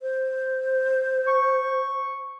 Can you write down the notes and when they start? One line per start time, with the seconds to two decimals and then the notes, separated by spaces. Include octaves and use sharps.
0.02 C5
1.27 C#6